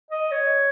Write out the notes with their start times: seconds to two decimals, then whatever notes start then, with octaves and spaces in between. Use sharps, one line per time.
0.11 D#5
0.32 C#5